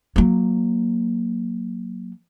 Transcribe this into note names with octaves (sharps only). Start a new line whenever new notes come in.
F#3 A#3